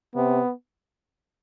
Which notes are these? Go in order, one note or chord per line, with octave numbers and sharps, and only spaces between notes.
C3 B3